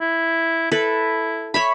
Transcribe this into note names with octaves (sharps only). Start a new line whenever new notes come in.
E4
E4 A4 B4
C#5 E5 B5